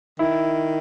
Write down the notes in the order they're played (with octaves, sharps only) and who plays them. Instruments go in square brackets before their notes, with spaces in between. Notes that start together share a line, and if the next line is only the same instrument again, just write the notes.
[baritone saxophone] D#3 [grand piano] E4